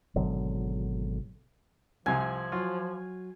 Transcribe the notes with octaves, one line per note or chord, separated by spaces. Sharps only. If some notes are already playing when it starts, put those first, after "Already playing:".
G#1 B2 D3 F#3
C2 C3 F3 G#5
F#3 F4 F#4